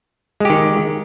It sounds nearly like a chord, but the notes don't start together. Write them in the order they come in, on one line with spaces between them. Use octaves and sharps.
G#3 G4 D#3